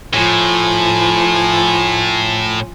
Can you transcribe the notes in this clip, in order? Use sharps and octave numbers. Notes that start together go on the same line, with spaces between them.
A2 F3 G#5